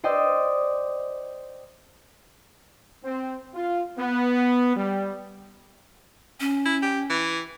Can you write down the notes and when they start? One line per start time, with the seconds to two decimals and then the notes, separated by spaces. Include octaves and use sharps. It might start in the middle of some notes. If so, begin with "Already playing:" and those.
0.04 C5 D5 D#5 G5 E6
3.04 C4
3.54 F4
3.98 B3
4.76 G3
6.40 C#4
6.65 E4
6.82 G4
7.10 E3